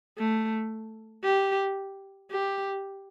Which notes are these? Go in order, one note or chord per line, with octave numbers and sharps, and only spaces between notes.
A3
G4
G4